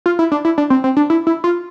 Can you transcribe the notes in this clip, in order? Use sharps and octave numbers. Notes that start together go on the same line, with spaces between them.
F4
E4
D4
E4
D4
C4
C4
D4
E4
E4
F4